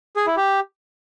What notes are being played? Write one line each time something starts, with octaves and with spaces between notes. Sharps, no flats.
G#4
E4
G4